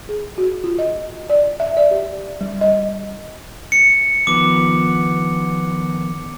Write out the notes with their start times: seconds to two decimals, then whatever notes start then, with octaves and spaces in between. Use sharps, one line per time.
0.09 G#4
0.38 F#4
0.64 F4
0.79 D#5
1.30 D5
1.60 E5
1.77 D5
1.91 G4
2.41 G3
2.61 D#5
3.72 C#7
4.27 D#3 F3 B3 D6